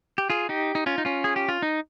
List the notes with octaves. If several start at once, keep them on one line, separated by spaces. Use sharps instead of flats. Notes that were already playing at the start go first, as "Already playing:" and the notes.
G4
F4 G#4
D#4 G4
D#4
C#4 F4
D#4
C#4 F4
G#4
G4
F4
D#4